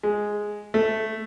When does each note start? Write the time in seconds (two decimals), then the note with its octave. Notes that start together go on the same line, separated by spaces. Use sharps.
0.03 G#3
0.74 A3